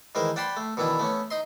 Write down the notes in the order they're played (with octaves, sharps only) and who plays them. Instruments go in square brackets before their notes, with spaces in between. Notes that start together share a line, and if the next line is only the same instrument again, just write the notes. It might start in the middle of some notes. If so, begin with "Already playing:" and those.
[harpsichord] D#3 E3 G#3 A#4 C5
D5 F#5 G5 A5 B5 C6
A3
B2 D#3 E3 D4 E4
A3 B3 C#4
D#4 D#5 C6